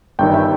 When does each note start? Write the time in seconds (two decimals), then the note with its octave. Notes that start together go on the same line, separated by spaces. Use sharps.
0.19 G1 G2 D#3 G5
0.34 E5